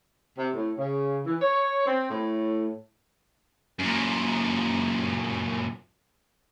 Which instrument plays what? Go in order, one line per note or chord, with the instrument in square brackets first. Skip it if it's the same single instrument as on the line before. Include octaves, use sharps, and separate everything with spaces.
[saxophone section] C3
A2
C#3
E3
C#5
C4
A2
[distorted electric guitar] F#2 A#2